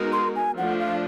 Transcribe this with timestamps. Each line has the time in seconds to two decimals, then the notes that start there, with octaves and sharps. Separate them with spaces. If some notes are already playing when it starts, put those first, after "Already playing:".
Already playing: G#3 B3 D#4 F#4 A#4
0.13 C6
0.36 G#5
0.57 F3 A3 D4 F4 F#5
0.80 F5